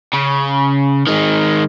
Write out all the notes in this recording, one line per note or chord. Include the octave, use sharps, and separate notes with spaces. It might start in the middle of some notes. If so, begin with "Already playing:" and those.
C#3
D#3 G#3